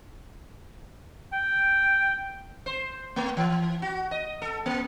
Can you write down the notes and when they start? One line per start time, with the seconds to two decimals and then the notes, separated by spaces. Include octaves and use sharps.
1.33 G5
2.66 C5
3.16 A3
3.37 E3
3.82 F#4
4.11 D#5
4.42 A4
4.66 A#3